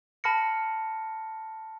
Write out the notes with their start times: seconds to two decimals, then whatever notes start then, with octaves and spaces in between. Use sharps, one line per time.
0.24 A5 B5 F6 A#6 C#7